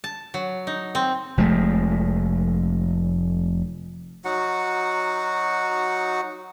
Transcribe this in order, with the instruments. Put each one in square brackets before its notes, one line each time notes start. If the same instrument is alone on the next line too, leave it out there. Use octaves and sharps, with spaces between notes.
[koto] A5
F#3
D#4
C4
[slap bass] F1 F3 G#3 A3
[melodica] F#3 D#4 F#4 F#5